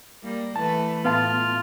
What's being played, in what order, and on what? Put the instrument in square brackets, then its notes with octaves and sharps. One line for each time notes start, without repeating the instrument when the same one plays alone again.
[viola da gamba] G3 A#3
[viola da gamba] E3 A3 B4 [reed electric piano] A5
[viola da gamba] A2 [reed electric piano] B3 F5 A5 [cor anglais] F4